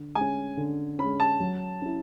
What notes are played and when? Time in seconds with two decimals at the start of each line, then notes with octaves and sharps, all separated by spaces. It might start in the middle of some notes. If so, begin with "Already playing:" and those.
Already playing: D3
0.15 G#3 G#5
0.21 C#4
0.57 D3
0.99 G#3 C#4 B5
1.20 A5
1.40 F#3
1.82 C#4 E4